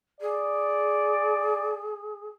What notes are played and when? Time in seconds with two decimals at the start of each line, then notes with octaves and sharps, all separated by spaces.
0.21 G#4 D5